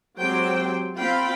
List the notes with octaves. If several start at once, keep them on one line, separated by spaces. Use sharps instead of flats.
F#3 G#3 C4 G4 C5 G5
C4 F4 F5 G5 B5